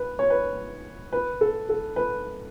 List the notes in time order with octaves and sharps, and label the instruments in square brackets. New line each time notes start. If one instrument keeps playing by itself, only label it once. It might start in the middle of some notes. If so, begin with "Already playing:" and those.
Already playing: [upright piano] B4
C#5
B4
B4
A4
A4
B4